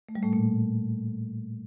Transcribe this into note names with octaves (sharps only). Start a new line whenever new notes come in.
A3
G3
A2 A3
A#2 A#3